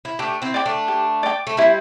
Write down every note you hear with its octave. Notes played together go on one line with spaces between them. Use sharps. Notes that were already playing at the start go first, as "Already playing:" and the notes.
E4
A3 D4 G4
C4 E4
D5 G5 D6
A3 D4
G4
D5 G5 D6
A3
G3 C4 E4